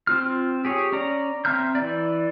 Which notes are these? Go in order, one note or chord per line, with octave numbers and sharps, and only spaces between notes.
C4 F4 F6
G4 G#4 C#5
C#4 D5 A#5
C4 E5 A#5 F6 G6
E3 D5